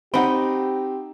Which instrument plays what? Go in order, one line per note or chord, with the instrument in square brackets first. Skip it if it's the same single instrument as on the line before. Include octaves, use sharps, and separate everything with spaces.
[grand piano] C4 [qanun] D#4 G5 [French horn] G4 [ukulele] F#5 B5